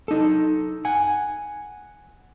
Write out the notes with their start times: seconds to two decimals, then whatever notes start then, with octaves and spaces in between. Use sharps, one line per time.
0.08 D#4 A4
0.85 F#5 G#5